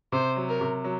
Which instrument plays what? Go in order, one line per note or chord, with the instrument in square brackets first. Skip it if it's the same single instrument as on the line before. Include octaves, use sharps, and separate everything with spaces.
[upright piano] C3 [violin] C5
[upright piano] F#3
[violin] A#4
[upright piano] C3
F#3